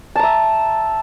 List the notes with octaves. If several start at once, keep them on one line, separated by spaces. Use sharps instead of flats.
E5 A5 A#5